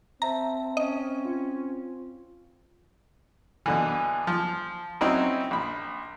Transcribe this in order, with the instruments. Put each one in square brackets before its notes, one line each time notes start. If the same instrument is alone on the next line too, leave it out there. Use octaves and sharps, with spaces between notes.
[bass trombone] C4 [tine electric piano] C5 E5 A5 [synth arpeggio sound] A#5
[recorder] C#4 [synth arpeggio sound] D#5
[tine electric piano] F4
[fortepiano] B2 D3 E3
F3
F#3 C4 C#4 D#4 E4
A#1 B5